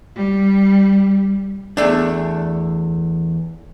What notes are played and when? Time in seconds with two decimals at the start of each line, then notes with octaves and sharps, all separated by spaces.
0.16 G3
1.77 E2 A3 D4